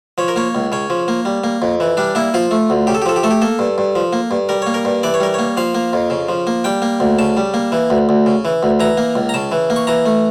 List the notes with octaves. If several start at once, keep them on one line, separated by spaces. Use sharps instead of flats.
F3 C#5
A#4
A#3 C#5
C#2
C#3 C#5
F3
A#3
G3
A#3
F2
E3
G3 D4
A#3 E4
F3 F4
A3
D2
C#3 G4
A4
G4
F3 A4
G4
A3 A4
G4
A#3 A4
G2
G2
F3
A#3
G2
G3 A#4
A#3 C#5
A#4
G2
E3 D5
C#5
G3 A#4
A#3 C#5
F3 F5
A#3
F2
C#3
F3
A#3
G3 G5
A#3
D2
C#3 A5
G3
A#3
E3
D2
D2
C#3
E3
D2
E3 A#5
A#3
C#2
A#5
C#3 A5
E3
A#3
C#6
E3 A#5
A3